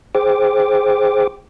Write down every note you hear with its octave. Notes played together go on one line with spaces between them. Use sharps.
G#4 C5 G5 D6